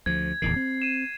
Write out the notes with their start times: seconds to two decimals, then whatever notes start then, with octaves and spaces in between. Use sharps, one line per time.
0.06 D2 F3 G#6
0.42 D1 E2 D#3 C7
0.56 C4
0.82 D#7 E7